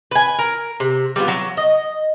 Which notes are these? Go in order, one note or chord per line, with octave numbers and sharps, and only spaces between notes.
B4 G#5
A#4
C3
G3 A3 B3 F4
F#3
D#5